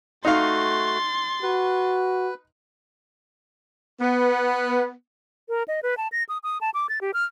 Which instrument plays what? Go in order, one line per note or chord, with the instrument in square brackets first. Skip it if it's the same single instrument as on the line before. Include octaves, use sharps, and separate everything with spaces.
[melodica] A3 F#4 [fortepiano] D#4 F5 [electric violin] C6 A6
[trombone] F#4 [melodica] B4
[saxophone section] B3
[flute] A#4
D#5
B4
A5
A#6
D#6
D#6
A5
D6
A6
G4
F6